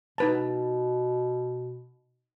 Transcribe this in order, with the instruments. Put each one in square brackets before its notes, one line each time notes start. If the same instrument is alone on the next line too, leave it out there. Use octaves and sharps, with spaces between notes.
[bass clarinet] B2 [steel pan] D#4 B4 A5